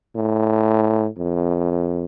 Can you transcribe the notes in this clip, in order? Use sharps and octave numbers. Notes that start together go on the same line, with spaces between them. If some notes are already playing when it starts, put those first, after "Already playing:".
A2
F2